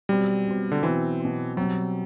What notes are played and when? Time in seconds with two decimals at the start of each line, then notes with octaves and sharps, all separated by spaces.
0.09 B2 F#3 G3 C4
0.47 B2 F#3 C4
0.72 D3
0.83 B2 E3 F#3 C4
1.20 B2 F#3 C4
1.57 B2 F#3 G3 C4